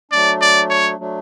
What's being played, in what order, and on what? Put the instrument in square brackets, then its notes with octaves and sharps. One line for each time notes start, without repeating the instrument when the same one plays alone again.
[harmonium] F#3 A3 D4 [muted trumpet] D5
[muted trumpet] D5
C#5
[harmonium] F#3 A3 D4